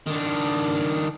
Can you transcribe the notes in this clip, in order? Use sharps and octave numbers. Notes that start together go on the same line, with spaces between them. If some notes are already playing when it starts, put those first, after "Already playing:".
D#3 D4